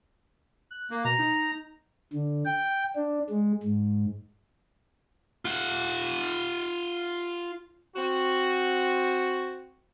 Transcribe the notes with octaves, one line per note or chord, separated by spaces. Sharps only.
F#6
A#3
B2 A#5
D#4
D3
G5
D4
G#3
G#2
F4 F#5
C4 F#4